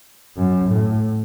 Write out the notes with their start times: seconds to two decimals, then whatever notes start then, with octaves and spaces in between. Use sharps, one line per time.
0.37 F#2
0.70 A2